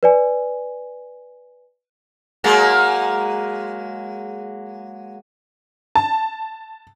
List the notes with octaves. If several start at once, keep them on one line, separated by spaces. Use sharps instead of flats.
B4 D5 G#5
F#3 G#3 A#3
A5